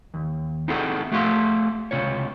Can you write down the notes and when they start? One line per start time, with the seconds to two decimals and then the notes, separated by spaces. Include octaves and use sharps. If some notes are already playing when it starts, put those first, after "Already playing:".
0.14 D#2
0.68 C4 D#4 E4 F#4 G#4 A4
1.12 A3 F#4 G#4 F5 C6
1.91 C#2 G2 C3 F4 C#5